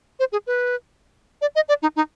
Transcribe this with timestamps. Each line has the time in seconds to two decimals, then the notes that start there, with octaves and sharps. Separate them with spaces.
0.20 C5
0.32 G#4
0.47 B4
1.41 D5
1.55 D#5
1.69 D5
1.82 D#4
1.96 D#4